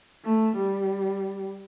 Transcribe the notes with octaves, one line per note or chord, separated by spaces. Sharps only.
A3
G3